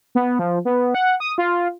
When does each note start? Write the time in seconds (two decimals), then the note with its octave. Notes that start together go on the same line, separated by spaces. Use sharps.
0.15 B3
0.39 F3
0.65 B3
0.95 F#5
1.20 D#6
1.38 F4